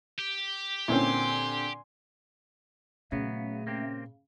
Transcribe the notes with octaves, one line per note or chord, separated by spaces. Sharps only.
G4
A#2 D3 C4 C#4 E4 G#5 C6
A#2 C#3 F#3 A3 B3
A#3 C4 G4